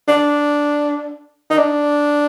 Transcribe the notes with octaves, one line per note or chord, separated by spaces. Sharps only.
D4
D#4
D4